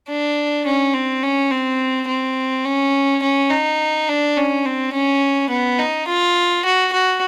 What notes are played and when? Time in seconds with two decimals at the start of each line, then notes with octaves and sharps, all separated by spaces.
0.09 D4
0.66 C#4
0.94 C4
1.23 C#4
1.51 C4
2.08 C4
2.65 C#4
3.22 C#4
3.50 D#4
4.08 D4
4.37 C#4
4.65 C4
4.93 C#4
5.50 B3
5.79 D#4
6.07 F4
6.65 F#4
6.93 F#4